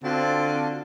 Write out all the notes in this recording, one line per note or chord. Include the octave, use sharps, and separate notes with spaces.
D3 C4 F4 F#4 A5